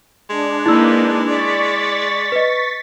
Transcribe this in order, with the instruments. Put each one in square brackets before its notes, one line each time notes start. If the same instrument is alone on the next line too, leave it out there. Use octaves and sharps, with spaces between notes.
[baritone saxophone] G#3 [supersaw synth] D4
[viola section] A#3 D#4 B4 [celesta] E4 E6
[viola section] D5 [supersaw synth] C#6 A6 B6
[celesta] B4 D#5